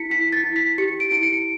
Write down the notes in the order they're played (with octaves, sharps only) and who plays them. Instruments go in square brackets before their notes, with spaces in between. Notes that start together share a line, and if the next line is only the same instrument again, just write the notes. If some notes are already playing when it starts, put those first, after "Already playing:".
Already playing: [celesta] E4 B6 C#7
E4 B6
A6
E4
B6
G4 C#7
D7
E4 D7
C#7